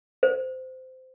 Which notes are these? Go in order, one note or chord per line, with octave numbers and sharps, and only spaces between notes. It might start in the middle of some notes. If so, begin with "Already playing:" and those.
C5